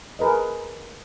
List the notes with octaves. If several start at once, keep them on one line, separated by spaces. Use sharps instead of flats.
G#4 A#4 B4 D#5